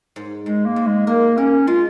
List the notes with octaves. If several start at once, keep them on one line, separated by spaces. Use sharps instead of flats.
G#2
G#2 G#3
A#3
G#2
G#3
A#3 A#4
C#4 A#4
G#3 F4